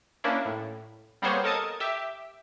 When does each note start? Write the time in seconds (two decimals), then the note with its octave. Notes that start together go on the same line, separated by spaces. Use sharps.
0.24 A#3 C#4 D4 E4
0.45 A2
1.22 G3 A#3 B3 G#4 C5 C#5
1.44 A4 A#4 D#5 A5 D#6 G#6
1.80 G4 E5